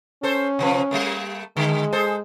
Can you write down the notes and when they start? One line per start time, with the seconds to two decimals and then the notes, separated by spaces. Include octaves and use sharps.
0.23 C#4 A4 C5
0.59 C3 F3 B4
0.91 G3 A3 A#3
1.57 D3 G#3
1.93 G#4 A4 C5